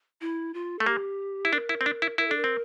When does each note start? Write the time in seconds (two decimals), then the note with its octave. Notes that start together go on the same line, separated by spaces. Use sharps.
0.21 E4
0.54 F4
0.79 A3 A4
0.86 A#3 G4
1.45 E4
1.53 D4 A#4
1.69 E4
1.81 C4
1.86 D4
2.02 E4
2.18 E4 A#4
2.27 D4 A4
2.37 A#4
2.44 C4